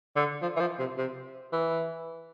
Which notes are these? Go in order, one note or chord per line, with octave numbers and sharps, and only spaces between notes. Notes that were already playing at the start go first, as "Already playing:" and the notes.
D3
F3
E3
F3
C3
C3
E3